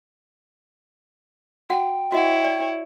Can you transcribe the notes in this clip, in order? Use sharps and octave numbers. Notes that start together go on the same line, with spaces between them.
F#4 F#5 G5
E4 F#4 C#5 D#5 F#5
D5